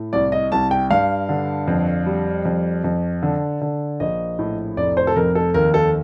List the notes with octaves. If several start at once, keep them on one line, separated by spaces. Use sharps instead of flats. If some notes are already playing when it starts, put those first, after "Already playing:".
Already playing: A2
C2 D5
D#5
C2 A5
G5
G2 F5
D3
F2
G3
F2
F2
D3
D3
A#1 D#5
A2
F1 D5
C5
A4
F2 A#4
A4
D#2 A#4
A4